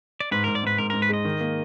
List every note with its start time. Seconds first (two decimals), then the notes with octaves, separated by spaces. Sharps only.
0.20 D5
0.31 G#2 B4
0.44 G#2 A#4
0.55 D5
0.63 G#2 B4
0.78 G#2 A#4
0.90 G#2 A#4
1.02 B4
1.09 G#3 D#5
1.25 D#3
1.41 A#3